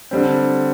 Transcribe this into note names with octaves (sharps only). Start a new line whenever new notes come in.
D3 G3 C4